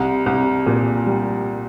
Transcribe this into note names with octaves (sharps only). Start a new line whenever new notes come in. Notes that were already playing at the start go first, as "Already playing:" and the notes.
Already playing: C2
C2
A#2
G3